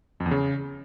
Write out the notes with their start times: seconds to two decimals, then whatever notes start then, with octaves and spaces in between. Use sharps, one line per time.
0.20 F2
0.26 E2
0.31 C#3